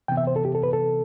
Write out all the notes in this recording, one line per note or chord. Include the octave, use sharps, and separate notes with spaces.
C3 E3 B3 G5
E5
C5
A4
G4
A4
B4
A4